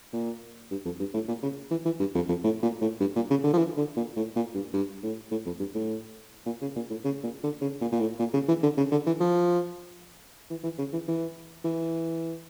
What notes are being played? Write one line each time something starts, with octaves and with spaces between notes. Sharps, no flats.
A#2
G2
F2
G2
A2
A#2
C#3
E3
E3
G2
F2
F2
A2
A#2
A2
G2
A#2
C#3
D3
F3
E3
D3
A#2
A2
A#2
G2
G2
A2
A2
F2
G2
A2
A#2
C#3
A#2
A2
C#3
A#2
D3
C#3
A#2
A#2
A2
A#2
C#3
E3
D3
C#3
D3
E3
F3
E3
E3
C#3
E3
E3
E3